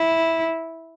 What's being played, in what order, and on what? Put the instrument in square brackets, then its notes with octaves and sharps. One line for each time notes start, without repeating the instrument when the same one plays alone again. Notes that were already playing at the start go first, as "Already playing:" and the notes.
Already playing: [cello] E4